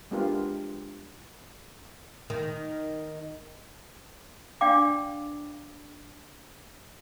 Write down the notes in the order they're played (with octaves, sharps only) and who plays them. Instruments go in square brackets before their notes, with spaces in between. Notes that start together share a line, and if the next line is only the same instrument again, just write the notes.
[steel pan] G#3 B3 D4 F4 G4 A#4
[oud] D#3
[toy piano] D4 D5 F5 G5 D6